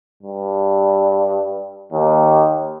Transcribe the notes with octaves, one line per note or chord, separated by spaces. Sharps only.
G2
D#2